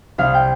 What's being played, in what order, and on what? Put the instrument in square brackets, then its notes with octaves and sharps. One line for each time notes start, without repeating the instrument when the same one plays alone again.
[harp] C2 F5
G5